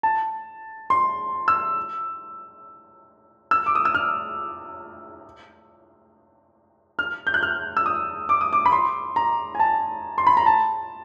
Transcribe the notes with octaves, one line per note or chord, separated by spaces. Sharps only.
A5
C6
E6
E6
D6
D#6
E6
F6
F6
G6
F#6
F6
E6
D#6
D6
D#6
D6
B5
C6
A#5
G#5
A5
C6
B5
A#5
A5